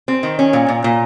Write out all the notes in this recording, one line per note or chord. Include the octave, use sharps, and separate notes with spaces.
C4
D#3
C#4
A#2
A#2
A#2